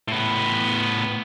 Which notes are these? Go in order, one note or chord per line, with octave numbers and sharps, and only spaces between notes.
A2 B3